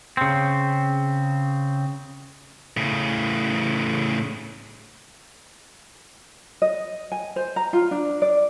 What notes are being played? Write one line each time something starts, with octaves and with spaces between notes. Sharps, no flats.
C#3 C4
A2 C#3
D#5
G#5
C5
A#5
F4
D4
D5